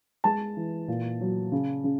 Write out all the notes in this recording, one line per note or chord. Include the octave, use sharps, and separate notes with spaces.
G#3 A5
E3
A#2
F#3
C#3
C#3